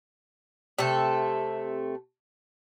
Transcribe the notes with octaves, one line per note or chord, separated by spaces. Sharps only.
C3 A3 A4